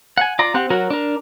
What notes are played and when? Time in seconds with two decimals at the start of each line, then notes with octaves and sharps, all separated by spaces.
0.18 F#5 G#5
0.39 F4 D5 A#5
0.54 C4 G4 F#5
0.70 F#3 F#4 A#4
0.90 D4 A#4